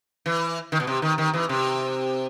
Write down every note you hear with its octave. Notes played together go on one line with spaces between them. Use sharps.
E3
D#3
B2
C3
D#3
D#3
E3
C3